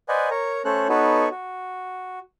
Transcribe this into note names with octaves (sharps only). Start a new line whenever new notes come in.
B4 C5 D5 D#5 F#5 G#5
A#4 C#5 A#5
A3 C#4 A4 C5 C#5 F#6
B3 D#4 F#4 A4 B4 C#5
F#4